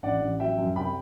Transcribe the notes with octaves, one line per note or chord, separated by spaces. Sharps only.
A1 D5 F#5
A1
F#3 E5 G5
F#2
C2 G5 B5